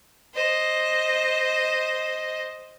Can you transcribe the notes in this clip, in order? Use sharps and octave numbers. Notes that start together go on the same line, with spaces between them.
C5 D#5